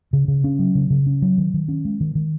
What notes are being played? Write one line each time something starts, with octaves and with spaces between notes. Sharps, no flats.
C#3
C#3
C#4
F#3
C#3
C#3
C#4
F#3
D#3
D#3
C#4
G#3
D#3
D#3